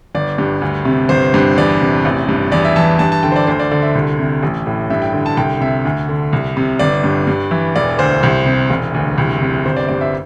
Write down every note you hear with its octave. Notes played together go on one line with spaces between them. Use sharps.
G1 D5
G2
D2
C3
G1 C5
G2
E2 D5
C3
A1
G2
E2 D5
E5
E3 A5
G2 A5
A5
D3 G5
C5
D5
D2 C5
D5
D3 D5
E5
C2
C3
A1
A2
G2 E5
G5
D3
A5
C2 G5
C3 E5
D2
D3
C2
C3
G1 D5
G2
G2
E3
E1 D5
D2 C5
C2
C3
E1
D2
C2
C3
G1 C5
D5
G2 D5
E5